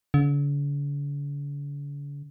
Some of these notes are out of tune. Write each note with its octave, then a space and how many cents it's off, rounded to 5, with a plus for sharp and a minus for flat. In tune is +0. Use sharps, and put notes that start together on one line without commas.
D3 -45